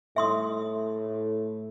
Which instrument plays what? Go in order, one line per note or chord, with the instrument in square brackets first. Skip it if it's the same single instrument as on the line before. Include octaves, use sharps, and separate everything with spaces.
[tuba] A2 [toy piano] E5 C6 D#6